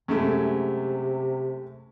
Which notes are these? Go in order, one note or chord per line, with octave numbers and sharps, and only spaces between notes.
F#2 C3 G#3 A3